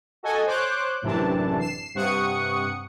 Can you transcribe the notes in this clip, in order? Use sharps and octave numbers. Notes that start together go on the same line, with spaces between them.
F#4 A4 D#5 G#5
C5 C#5 D6 F#6 G6
A1 F#2 C3 E3 D4 A5
C7 E7
G2 C3 F#5 C#6 D#6 C#7